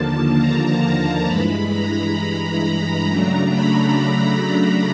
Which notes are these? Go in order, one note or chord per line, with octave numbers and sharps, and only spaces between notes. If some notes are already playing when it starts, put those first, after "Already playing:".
Already playing: D#2 D3 F3 A#3 A5
A#5
G2 E3 G#3 B5
A#5
B5
A#5
C#3 F#3 A3 D4
B5
A#5